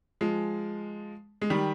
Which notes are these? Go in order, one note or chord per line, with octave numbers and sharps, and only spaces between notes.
F3 G#3
G#3
D#3 G3